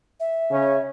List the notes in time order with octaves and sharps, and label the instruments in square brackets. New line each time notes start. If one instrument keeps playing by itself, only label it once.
[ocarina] E5
[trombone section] C#3 C#4